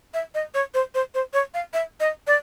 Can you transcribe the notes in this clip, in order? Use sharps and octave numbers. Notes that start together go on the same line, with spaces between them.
E5
D#5
C#5
C5
C5
C5
C#5
F5
E5
D#5
D5